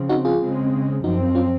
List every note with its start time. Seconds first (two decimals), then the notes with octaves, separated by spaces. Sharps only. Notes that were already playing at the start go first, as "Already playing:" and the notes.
Already playing: C#3 F3 C4
0.09 D#4 F#4
0.25 F4 G#4
0.41 C#3 G#3 C4
1.03 F#2 F3 C4 D#4 F#4
1.35 C#4 F4